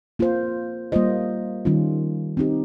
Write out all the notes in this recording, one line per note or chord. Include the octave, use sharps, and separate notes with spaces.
A#3 F4 C5
G3 A#3 F4 C5 D#5
D#3 G3 C#4 F4
C4 D#4 G4